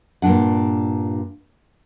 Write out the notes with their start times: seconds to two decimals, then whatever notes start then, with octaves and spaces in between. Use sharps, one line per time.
0.22 G2 A#2 C#4 D4 F#5